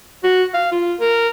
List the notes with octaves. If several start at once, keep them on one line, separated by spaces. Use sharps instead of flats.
F#4
F5
F4
A#4